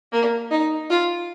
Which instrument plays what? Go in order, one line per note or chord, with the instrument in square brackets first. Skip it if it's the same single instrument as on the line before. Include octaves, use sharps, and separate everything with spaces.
[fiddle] A#3
D#4
F4